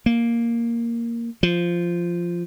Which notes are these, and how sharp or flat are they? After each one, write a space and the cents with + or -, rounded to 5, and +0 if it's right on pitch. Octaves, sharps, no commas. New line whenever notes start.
A#3 +0
F3 -10